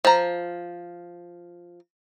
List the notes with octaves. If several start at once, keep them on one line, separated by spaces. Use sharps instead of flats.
F3 A#5